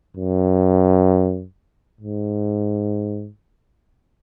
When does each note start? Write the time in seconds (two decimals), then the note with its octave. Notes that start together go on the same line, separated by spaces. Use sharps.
0.17 F#2
2.01 G#2